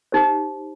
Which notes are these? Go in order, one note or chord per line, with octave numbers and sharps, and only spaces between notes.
D#4 G4 C5